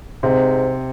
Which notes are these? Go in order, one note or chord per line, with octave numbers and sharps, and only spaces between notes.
G#2 C3